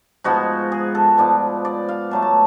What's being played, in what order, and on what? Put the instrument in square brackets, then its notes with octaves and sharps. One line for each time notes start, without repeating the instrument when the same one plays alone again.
[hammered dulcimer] G#2 F3 G#3 B3 F#4
G#4
A4
G#2 F3 B3 D5
D5
F5
B2 F#3 A3 A5
A5